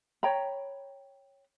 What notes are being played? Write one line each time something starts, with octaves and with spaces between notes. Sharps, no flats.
C#5 G5 A#5 B5